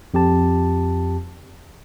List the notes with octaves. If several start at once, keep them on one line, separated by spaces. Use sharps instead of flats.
F2 G4 A5